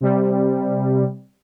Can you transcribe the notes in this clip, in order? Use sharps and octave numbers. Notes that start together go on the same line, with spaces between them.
C3 G3